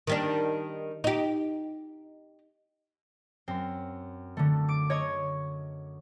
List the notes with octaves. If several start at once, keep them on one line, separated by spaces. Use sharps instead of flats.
D#3 G3 D4
D#4 G4
F#2 C4
D3 A3
D6 D7
C#5 D#5 C#6 G#6